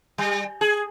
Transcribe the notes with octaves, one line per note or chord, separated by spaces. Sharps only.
G3
G#4